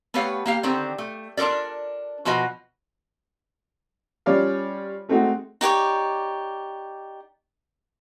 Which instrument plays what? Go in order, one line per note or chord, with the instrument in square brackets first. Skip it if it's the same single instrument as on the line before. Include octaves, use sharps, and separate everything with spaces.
[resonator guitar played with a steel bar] A3 B3 G4 B4 C#5 F5
A#3 G4 F5
D3 D#3 C4
A3
D4 F4 A4 A#4 D5
B2 F3 F#4 B4 D#5
[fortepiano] G3 C#4 F4 C#5 D5 F5
G#3 A3 C4 D#4 F#4
[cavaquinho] D#4 G4 C#5 D5